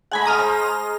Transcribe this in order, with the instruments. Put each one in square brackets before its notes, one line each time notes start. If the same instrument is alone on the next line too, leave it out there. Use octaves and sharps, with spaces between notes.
[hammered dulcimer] G#3 A3 D#5 [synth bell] F#5 G#5 B5
[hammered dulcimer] G#3 [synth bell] A#5 D#6 F6
[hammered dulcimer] C5 D#5